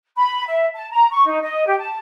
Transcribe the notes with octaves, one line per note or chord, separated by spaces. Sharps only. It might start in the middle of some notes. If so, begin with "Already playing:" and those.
B5
E5
A5
A#5
C#6
D#4
D#5
G4
A5